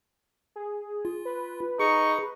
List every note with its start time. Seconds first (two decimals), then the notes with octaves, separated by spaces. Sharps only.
0.56 G#4
1.05 F4
1.25 B4
1.80 D#4 G#4 C#6